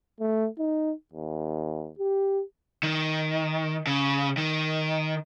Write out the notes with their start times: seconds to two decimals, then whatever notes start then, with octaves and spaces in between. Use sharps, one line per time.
0.20 A3
0.58 D#4
1.13 D#2
1.99 G4
2.83 D#3
3.87 C#3
4.37 D#3